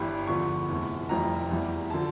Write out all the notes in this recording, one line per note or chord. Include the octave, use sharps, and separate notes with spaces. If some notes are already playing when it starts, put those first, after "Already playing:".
Already playing: G1 G2 E3 G3
E2 D3 F3 C#6
F1 E2 E3
F1 F2 E3 G3 A#5
E2 E3 G3
D3 F3 A5